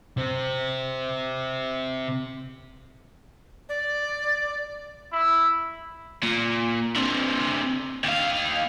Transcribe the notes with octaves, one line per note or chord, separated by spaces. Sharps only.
C3 C4
D5
E4
A#2
D3 C4
D#2 F5